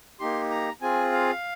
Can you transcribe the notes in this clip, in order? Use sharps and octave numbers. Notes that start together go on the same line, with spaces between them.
A#3 D#4 G4 C6
A#5
C4 F4 G#4 G#5
F5